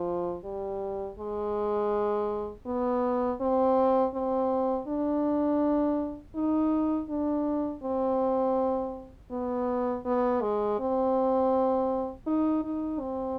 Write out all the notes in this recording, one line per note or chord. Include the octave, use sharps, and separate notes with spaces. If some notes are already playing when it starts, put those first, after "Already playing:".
Already playing: F3
G3
G#3
B3
C4
C4
D4
D#4
D4
C4
B3
B3
G#3
C4
D#4
D#4
C4